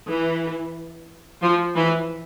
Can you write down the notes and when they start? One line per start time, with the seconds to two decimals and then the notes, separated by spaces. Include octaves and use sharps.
0.08 E3
1.42 F3
1.76 E3